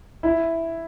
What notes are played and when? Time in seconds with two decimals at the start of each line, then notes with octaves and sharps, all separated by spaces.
0.23 E4